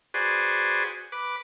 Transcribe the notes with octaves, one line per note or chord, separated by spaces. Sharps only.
F#4 G#4 B4 C5 D5 G#5
B4 D6